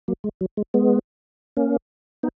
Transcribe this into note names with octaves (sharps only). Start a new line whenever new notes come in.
F#3 A#3
G#3
F#3
G#3
G#3 B3
A#3 C#4
B3 D#4